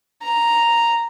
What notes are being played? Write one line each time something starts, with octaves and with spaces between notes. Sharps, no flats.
A#5